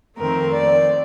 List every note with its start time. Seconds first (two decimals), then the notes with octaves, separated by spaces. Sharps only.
0.18 F2 D#3 A3 C4 A#4
0.52 D5